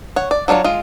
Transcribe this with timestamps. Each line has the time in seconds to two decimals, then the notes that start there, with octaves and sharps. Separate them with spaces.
0.16 C#5 F#5
0.31 D5
0.48 F#3 D4 F4 A#4 C#5
0.64 G#3 F4